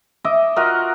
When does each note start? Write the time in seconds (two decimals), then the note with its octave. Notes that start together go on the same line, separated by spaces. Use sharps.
0.24 D#5 E5 D6
0.56 F4 F#4 A#4 D#5